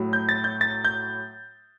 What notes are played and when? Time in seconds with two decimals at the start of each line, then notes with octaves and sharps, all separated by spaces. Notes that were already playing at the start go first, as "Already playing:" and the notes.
Already playing: A2 F#3
0.13 G6
0.29 A6
0.44 G6
0.61 A6
0.85 G6